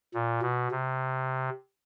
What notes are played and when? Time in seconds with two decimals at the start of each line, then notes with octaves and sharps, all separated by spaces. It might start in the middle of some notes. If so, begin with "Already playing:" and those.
0.14 A#2
0.42 B2
0.71 C3